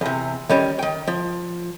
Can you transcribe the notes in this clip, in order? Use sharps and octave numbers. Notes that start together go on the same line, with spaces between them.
E2 C3
D#3 G3 C#4
D#3 G5
F3